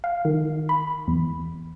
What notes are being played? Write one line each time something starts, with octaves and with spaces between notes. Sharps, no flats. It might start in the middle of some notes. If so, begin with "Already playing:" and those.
F5
D#3
B5
E2